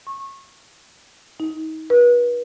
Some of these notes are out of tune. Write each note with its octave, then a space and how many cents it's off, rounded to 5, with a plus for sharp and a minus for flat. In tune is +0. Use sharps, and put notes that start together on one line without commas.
C#6 -25
D#4 +30
B4 -35